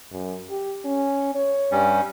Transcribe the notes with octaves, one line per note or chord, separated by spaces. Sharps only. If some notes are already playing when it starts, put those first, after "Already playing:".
F#2
G4
C#4
C#5
G2 G3 C#4